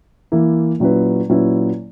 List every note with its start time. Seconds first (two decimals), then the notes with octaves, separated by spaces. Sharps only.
0.32 E3 A#3 E4
0.80 A#2 F#3 C#4 E4 B4
1.29 A#2 F#3 C#4 E4 B4